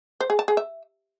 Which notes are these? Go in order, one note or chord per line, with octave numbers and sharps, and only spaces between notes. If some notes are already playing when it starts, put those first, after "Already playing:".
C5
G#4
A5
G#4
E5